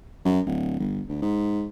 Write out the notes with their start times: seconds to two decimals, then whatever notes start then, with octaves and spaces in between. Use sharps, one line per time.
0.25 F#2
0.46 D1
0.79 G1
1.08 D2
1.22 G#2